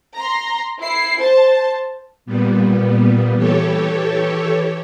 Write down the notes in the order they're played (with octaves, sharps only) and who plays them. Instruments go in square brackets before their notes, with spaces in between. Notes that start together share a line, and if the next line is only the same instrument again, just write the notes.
[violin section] A#5 C6
E4 C7
C5 A5
[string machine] A#2 G3 B3
E3 G4 A4 C#5